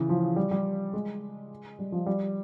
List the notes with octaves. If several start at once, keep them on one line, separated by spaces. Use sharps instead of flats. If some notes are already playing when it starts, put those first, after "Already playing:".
Already playing: C#3 E3
F3
G3
G3
G#3
G3
F3
G3